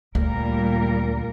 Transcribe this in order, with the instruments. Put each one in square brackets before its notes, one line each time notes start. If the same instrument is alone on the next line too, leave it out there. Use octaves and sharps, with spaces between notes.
[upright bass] D2 [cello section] A#2 G3 A#4